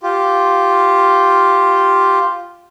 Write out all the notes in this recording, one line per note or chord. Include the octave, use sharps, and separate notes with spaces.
F4 G4